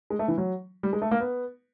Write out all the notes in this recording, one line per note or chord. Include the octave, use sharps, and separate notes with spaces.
G#3
A3
E3
F#3
G3
G#3
A3
A#3
B3